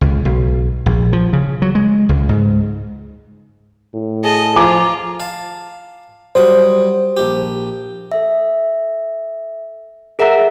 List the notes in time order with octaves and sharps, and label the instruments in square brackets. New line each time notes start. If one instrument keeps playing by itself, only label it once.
[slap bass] C#2
B1
A#1
F3
C#3
F#3
G#3
C#2
G#2
[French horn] A2
[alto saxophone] G#4 [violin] D#5 A5
[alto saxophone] F3 [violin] F4 [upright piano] G#5 A#5 D6
[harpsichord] F5 A5
[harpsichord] F#3 G3 D#6 [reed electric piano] C5
[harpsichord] A#1 G4
[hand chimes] A4 E5
G#4 A#4 E5 F#5 A#5 E6